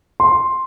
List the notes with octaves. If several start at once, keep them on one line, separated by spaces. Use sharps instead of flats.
C6